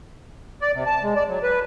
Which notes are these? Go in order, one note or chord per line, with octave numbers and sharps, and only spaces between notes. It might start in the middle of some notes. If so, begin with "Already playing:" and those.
D5
C3
A5
G#3
D5
F#3
B4